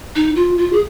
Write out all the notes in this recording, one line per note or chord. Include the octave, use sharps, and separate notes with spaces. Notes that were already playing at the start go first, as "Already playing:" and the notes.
D#4
F4
F4
G#4